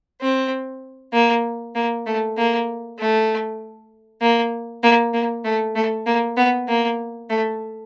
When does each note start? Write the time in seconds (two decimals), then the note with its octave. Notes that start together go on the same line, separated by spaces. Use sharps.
0.22 C4
1.13 A#3
1.75 A#3
2.06 A3
2.37 A#3
2.99 A3
4.22 A#3
4.83 A#3
5.14 A#3
5.44 A3
5.76 A3
6.07 A#3
6.37 B3
6.68 A#3
7.30 A3